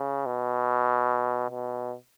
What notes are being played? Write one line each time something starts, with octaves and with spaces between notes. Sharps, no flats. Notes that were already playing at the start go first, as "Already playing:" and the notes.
Already playing: C#3
B2
B2